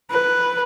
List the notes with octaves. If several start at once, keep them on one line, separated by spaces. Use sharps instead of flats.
B4